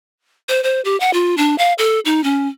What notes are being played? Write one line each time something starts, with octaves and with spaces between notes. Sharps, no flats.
C5
C5
G4
F#5
F4
D4
F5
A4
D#4
C#4